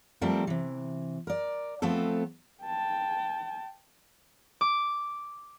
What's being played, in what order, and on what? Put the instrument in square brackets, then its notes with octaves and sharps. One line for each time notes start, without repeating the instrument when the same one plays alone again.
[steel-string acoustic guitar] F3 G3 A3 C4 A4 A#4
C3 E3
A#4 D5
F3 A3 B3 C4 A4
[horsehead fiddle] G5 A5
[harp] D6